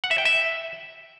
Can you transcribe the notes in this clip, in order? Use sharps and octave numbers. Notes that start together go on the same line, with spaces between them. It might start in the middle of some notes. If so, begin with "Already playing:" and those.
F#5
E5
G5
E5